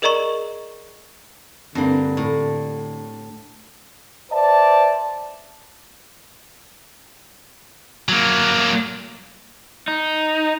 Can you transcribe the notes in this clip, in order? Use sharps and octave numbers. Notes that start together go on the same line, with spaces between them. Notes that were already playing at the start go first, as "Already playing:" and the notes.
G#4 A#4 D5 D#5 A#5 C#6
G2 D3 A#3 C4 D4
A2
B4 C5 D5 E5 A5
F#3 A#3
D#4